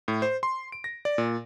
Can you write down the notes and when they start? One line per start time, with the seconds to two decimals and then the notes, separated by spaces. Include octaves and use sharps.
0.08 A2
0.22 C5
0.43 C6
0.72 D7
0.84 A#6
1.05 D5
1.18 A#2